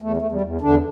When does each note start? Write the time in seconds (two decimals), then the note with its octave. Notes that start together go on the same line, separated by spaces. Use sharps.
0.02 E2 A3
0.17 E2 A3
0.32 G3
0.41 E2
0.61 E2 D3 D4